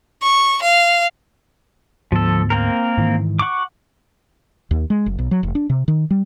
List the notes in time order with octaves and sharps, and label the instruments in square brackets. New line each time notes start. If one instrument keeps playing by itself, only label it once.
[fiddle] C#6
F5
[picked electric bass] D2 G#2 B3 [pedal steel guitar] F3 A4
[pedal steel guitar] A#3 C4 A#4
[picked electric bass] G#2 D#3 E3
[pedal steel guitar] F#5 C#6 D6
[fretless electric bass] D#2
G#3
F#1
B1
F#3
F1
D4
C3
D#3
G3